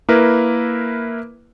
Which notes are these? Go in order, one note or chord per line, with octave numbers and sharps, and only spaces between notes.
A#3 E4 A#4 B4